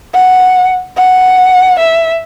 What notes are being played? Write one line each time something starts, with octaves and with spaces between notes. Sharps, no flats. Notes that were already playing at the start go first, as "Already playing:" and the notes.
F#5
F#5
E5